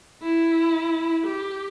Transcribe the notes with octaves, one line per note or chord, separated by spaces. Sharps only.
E4
G4